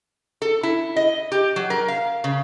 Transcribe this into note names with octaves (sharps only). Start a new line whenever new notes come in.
A4
E4
D#5
G4
F#3
A#4
F5
C#3